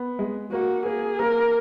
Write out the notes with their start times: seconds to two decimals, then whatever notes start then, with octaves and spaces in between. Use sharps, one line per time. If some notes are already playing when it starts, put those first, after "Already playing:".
Already playing: B3
0.19 G#3
0.52 A#3 F#4
0.86 A#3 G#4
1.19 A#3 A#4